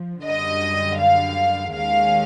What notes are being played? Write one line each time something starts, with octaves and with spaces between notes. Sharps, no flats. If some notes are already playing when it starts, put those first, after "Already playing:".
Already playing: F3
F#2 D3 G3 D#5
F5
D#2 D#3 G#3 C#4 F5